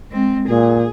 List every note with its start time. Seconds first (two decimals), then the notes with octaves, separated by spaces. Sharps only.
0.11 G#3 C4
0.49 A#2 G#4